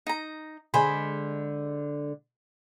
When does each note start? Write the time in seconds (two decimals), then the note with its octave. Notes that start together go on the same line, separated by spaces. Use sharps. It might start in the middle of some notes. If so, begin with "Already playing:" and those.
0.07 D#4 A#5
0.74 D3 G#3 C5 G#5 B5